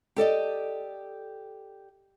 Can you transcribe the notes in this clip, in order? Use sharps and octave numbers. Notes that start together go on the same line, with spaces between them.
G4 A4 D5 D#5